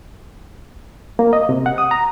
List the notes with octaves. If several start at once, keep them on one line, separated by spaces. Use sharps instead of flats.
A#3
D#5
C3
F#5
D#6
A#5